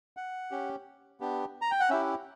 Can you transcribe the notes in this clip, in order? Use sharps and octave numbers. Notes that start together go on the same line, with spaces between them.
F#5
C#4 G4
B3 D4 G4
A#5
G5
F#5
C#4 E4 G4 E5